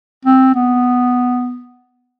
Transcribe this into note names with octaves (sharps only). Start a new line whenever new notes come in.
C4
B3